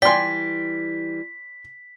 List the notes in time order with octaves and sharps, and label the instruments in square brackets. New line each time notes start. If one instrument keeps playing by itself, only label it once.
[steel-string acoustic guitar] E3 G3 [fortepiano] D5 C6 [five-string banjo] G5 G#5 [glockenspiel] B6